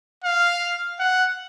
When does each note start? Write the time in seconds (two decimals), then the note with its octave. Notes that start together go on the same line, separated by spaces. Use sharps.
0.24 F5
0.99 F#5